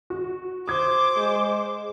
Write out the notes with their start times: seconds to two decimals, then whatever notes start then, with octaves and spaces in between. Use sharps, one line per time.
0.10 F#4
0.68 C5 D6 D#6 G#6
1.17 G#3